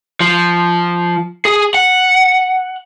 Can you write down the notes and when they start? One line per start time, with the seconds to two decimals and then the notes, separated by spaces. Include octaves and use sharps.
0.20 F3
1.45 G#4
1.74 F#5